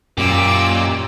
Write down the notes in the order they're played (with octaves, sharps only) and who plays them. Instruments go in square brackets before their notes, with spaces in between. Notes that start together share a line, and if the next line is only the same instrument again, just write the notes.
[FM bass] F#2 [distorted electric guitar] A#2 [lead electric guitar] C#4 G4 [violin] D6 E6